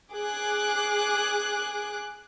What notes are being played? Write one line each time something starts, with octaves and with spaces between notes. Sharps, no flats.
G#4 D6 F#6